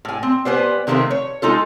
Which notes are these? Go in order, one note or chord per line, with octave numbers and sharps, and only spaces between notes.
A2 G#5
C4
G3 B3 C5 G#5
C3 D#3 F3 G#3 A3 C4
C#5
G#3 D#4 F4 A4